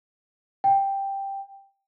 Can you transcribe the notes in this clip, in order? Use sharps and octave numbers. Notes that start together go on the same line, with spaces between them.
G5